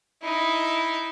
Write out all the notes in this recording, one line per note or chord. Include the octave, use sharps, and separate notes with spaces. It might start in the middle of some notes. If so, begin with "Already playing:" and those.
D#4 E4